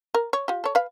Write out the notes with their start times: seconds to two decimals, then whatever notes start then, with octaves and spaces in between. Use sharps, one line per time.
0.14 A#4
0.33 C#5
0.48 F4 G4
0.64 A4 C#5
0.75 B4 F5